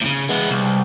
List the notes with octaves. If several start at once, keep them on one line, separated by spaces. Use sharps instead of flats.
A2 C#3
G#3 B3
C2